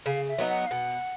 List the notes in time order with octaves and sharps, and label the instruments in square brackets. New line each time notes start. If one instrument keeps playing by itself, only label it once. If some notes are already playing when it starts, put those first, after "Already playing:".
[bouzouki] C#3 [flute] F5
[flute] E5
[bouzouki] F#3 B3 D#4
[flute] F#5
F5
[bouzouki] B2 [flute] F#5